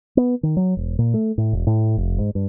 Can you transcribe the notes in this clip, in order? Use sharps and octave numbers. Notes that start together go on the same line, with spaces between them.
B3
D#3
F#3
E1
A#2
A3
A2
E1
A2
F1
G#2
G2